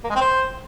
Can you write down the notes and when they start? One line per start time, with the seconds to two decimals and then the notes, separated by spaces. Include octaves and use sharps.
0.04 A#3
0.10 G#3
0.15 C4
0.21 C5